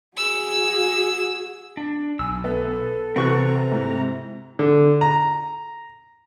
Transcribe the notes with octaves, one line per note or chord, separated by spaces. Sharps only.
F#4 G#4 E6
D4
B1 G#5 E6
B3 A4
C3 E3 C4 F#4 B4 A#5 C#6 F#6
G#2 E4
D3
A#5